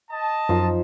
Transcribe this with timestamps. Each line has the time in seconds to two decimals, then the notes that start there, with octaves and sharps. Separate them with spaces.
0.10 D#5 A5
0.49 F#2 F3 D#4 E6